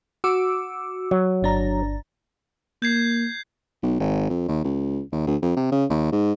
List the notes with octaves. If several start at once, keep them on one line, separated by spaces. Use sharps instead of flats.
F#4 D6 E6
F#3
G1 D4 A#5
A#3 G6 G#6 C7
B1
G#1
F2
D#2
C#2
D#2
D2
F2
C3
C#3
D#2
G#2